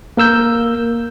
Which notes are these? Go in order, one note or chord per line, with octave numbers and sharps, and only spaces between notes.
A#3 A#4 E6 G6